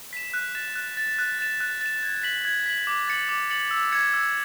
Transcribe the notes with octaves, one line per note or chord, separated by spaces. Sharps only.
B6 E7
F#6
A6 E7
F#6
A6 E7
F#6
A6 E7
F#6
A6 E7
G#6
B6 F#7
G#6
B6 F#7
D6
A6 C#7 F#7
D6
A6 C#7 F#7
E6
G#6 C#7 E7
E6